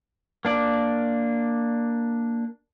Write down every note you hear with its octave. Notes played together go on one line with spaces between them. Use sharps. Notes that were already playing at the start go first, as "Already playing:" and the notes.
A#3 D4 D5